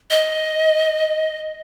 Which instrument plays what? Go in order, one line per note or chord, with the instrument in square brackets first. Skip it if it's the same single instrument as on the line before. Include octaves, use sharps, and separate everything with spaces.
[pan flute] D#5